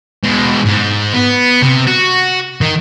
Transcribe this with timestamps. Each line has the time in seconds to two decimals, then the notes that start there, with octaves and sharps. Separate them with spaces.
0.24 B2 G#3
0.65 G#2
1.13 B3
1.62 C3
1.87 F#4
2.61 D#3